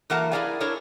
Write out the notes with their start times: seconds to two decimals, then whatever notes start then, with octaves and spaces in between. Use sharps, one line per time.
0.10 E3 F#3 A#3 A#4 F#5 A5
0.32 E4 G#4 A#4 D5 F5 G#5
0.60 D4 E4 A4 A#4 C#5